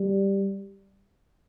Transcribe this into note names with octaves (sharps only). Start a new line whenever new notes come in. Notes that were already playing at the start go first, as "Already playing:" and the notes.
Already playing: G3